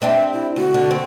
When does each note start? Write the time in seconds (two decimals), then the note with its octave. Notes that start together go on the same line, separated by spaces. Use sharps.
0.02 C4 D4 G4 E5
0.33 E4
0.56 D2 F#4
0.74 D3
0.91 C4